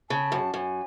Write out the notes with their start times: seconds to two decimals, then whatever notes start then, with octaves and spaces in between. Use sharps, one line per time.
0.10 C#3 A5
0.32 F#2
0.54 F#2 A5
0.57 G#5